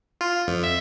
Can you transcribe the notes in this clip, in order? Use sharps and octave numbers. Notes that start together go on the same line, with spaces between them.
F4
F2
E5